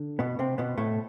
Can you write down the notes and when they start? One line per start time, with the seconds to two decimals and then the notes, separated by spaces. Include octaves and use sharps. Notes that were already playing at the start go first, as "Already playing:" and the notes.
Already playing: D3
0.19 B2 B3
0.39 C3 C4
0.58 B2 B3
0.77 A2 A3